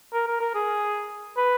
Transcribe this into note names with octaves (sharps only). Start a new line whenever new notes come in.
A#4
A#4
A#4
G#4
B4